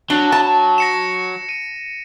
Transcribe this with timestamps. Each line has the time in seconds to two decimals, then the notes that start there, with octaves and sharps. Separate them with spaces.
0.10 F#3 D4
0.32 A5
0.78 A#6 C#7 E7
1.49 D#7